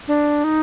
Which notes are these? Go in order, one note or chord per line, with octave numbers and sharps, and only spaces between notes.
D4
D#4